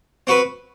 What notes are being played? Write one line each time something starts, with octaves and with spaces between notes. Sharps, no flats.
C4 F#4 B4